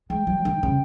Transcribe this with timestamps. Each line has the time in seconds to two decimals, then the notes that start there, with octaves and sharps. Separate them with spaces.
0.10 G#3 G5
0.27 F#3
0.45 D#3
0.63 C#3